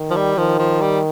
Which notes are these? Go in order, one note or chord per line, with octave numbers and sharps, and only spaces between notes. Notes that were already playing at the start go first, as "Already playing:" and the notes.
Already playing: D#3
F3
G3
D#3 F3
F3
G3